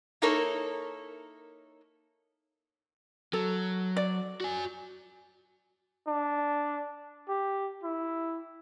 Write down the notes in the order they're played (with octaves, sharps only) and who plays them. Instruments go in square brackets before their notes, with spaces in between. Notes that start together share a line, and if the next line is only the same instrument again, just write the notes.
[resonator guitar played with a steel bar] A#3 D#4 E4 A4 A#4 C#5
[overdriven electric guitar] F#3 [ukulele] A4
[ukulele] D5
[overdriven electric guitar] F#4 G#5
[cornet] D4
G4
E4